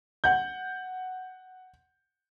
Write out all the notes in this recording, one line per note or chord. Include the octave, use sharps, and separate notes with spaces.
F#5 G6